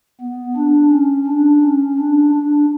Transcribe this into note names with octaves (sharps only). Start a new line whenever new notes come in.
B3
D4
C#4
D4
C#4
D4
D4